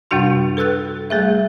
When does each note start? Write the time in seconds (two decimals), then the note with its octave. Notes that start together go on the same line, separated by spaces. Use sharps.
0.11 F#2 C3 G3 D4 F#4 C6
0.57 A4 B4 E6 F#6 A6
1.10 G3 A3 G#4 E5